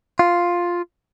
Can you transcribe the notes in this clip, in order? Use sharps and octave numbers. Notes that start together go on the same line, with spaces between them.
F4